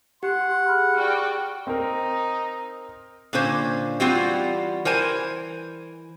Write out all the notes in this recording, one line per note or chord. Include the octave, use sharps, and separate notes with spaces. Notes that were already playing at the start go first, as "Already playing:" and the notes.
G4 F#5 C6
G#4 B5 F6
F#4 D5 G5
C4 D#4 A#4
A#2 D3 C#4 C5
E3 G3 C4 F4 F#4
E3 A#4 C5 G#5